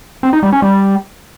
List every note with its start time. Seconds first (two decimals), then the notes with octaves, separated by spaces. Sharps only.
0.23 C4
0.33 D#4
0.43 G3
0.52 C#4
0.62 G3